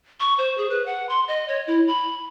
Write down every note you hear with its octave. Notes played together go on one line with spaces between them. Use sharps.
C#6
C5
G#4
B4
F#5
C6
D#5
C#5
E4
B5